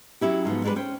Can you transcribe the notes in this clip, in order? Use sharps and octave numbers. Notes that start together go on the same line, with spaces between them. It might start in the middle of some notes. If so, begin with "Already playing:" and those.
F#3 C#4 E4 G4
G#2 F3 F#3 B3
G3 G#3 D4 A4 B4
C#4 C5 G5